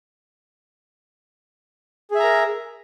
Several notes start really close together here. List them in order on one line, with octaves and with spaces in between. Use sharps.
G#4 E5 A#5 A#4